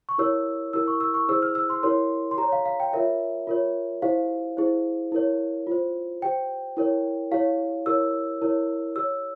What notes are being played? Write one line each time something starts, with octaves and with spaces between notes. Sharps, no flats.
C#6
E4 G4 A#4 C#5 E6
E4 G4 A#4 E6
C#6
E6
C#6
E4 G#4 C5 E6
F6
E6
C6
E4 G4 A#4 C#5 C6
C6
G4 C#5 A#5
F5
F5
G5
F4 A#4 C#5 E5
F4 A#4 C#5
E4 G4 C5 F5
E4 G#4 C5
E4 A#4 C#5
F4 C5
G4 C5 G5
E4 A#4 C#5
E4 G4 C#5 F5
E4 G4 A#4 C#5 E6
E4 A#4 C#5
G4 C#5 E6